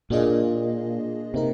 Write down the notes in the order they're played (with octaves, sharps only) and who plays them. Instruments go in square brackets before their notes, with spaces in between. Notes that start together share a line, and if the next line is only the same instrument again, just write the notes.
[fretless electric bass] A#2 [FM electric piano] A#3 D4 F4 G#4 D#5
[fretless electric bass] C3 [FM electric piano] A#3 D#4 A#4